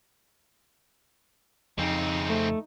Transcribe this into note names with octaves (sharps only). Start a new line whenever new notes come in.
F2 C#3 C4 D#4
A3